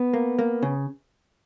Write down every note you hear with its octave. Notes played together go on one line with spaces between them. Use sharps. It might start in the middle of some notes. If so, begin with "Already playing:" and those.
Already playing: B3
A#3
A#3
C#3